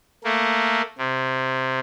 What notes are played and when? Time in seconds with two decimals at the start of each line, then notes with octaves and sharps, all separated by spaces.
0.24 A3 A#3
0.98 C3